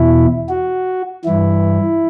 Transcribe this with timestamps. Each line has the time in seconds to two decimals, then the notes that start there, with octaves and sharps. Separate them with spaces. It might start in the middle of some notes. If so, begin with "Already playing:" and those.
Already playing: E2 B2 E4
0.49 F#4
1.25 G2 E3 E4